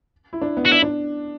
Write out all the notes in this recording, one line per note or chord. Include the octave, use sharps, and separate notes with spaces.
E4
D4
B3
F#4
D4 E4
D4